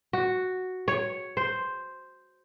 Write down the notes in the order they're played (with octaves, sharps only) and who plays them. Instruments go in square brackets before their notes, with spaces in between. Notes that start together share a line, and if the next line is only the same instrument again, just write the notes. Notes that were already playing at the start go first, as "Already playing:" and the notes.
[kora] F#4
C#5
C5